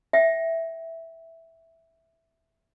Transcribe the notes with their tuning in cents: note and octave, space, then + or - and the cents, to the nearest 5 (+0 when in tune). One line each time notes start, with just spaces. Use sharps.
E5 +0 G5 -30